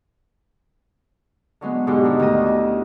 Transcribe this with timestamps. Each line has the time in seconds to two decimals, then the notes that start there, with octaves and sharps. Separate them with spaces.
1.61 D3 F#3 G#3 B3
1.87 G#2 B2 D3 G4
2.04 D#3 D4
2.19 D2 D#5
2.46 E4